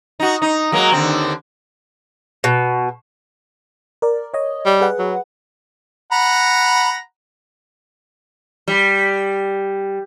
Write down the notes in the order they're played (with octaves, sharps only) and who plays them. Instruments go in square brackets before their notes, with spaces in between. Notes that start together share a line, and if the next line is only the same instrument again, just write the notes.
[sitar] D#4 F#4
D#4
F#3 G#3 A#3
D#2 D3 C4
[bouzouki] B2
[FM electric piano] A#4 D5
C#5 D#5
[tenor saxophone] G3
[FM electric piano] G#4 B4 F#5
[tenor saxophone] F#3
[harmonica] F#5 A#5 B5
[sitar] G3